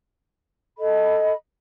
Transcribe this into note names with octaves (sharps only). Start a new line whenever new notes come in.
A4 D#5 B5